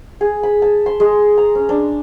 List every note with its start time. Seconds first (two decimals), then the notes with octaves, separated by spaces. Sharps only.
0.21 G#4
0.43 B5
0.62 A5
0.86 C6
1.00 G#3
1.38 A#5
1.55 C#4
1.69 D4